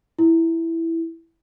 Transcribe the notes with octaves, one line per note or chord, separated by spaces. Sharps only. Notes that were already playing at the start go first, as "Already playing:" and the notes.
E4